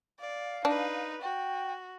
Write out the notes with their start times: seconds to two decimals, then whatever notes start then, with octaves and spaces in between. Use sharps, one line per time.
0.19 D5 F5
0.65 D4 D#4 B4
1.21 F#4 G5